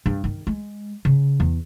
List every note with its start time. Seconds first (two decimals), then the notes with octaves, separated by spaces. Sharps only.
0.06 G2
0.24 D#3
0.47 G#3
1.05 C#3
1.40 E2